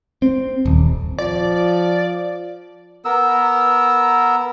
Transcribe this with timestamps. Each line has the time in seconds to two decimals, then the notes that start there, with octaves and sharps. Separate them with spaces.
0.22 C4
0.66 D#1
1.18 F3 D5
3.05 B3 A#4 E6